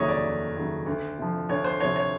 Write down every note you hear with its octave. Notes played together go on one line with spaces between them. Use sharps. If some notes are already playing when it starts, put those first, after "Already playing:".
Already playing: F1 D#2 C#3 F#3 C#5 D#5 E5
D5
F1
D#2 C#3 F#3
D2
C3 F3
D2 C#5
C5
C3 F3 C#5
C#5